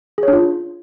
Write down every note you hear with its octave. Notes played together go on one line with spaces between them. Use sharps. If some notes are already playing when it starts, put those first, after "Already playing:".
D4 F4 G#4 C#5